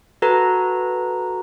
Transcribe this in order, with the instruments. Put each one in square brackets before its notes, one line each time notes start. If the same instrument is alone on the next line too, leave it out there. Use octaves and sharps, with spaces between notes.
[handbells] F#4 A4 B4 A#5